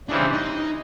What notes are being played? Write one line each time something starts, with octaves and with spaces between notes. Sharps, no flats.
C#3 E3 G3 C4 D4
D#4